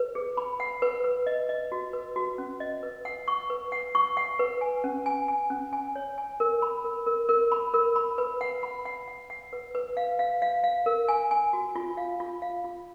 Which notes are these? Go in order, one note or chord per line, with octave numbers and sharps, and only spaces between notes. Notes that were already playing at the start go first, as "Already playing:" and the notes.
Already playing: B4
G#4
B5
F#5
B4
B4
D#5
D#5
F#4
B4
F#4
C#4
D#5
B4
F#5
C#6
B4
F#5
C#6
F#5
B4
G#5
C#4
G#5
G#5
C#4
G#5
C#5
G#5
A#4
B5
A#4
A#4
A#4
B5
A#4
B5
B4
F#5
B5
F#5
F#5
F#5
B4
B4
F5
F5
F5
F5
A#4
G#5
G#5
F#4
F4
F5
F4
F5
F4